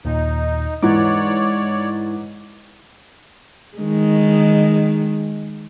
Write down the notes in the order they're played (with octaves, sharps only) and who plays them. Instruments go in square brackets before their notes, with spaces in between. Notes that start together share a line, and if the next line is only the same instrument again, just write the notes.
[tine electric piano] D#2 A#2 [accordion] D#4
[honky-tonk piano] G#2 E3 [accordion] C#5 D5 [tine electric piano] F#5 A#5 D6
[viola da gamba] D#3 G#3